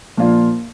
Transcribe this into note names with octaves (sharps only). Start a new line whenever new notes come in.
A#2 F3 A#3 D4 F4